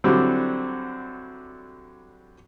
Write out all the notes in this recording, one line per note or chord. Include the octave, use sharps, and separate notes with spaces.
D3 F#3 G3 C4 E4